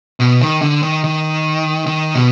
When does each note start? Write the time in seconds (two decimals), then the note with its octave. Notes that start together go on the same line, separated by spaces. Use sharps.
0.20 B2
0.41 D#3
0.61 D3
0.83 D#3
1.04 D#3
1.86 D#3
2.15 B2